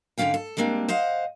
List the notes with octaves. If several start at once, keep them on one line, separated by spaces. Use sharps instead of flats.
G#2 D3 F3 C#4 F5 G5
A4
G3 G#3 A#3 C4 D4
C5 D#5 F5 F#5